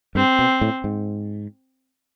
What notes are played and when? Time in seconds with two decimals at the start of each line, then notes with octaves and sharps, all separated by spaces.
0.15 G2 C4
0.39 B2
0.61 A2
0.84 G#2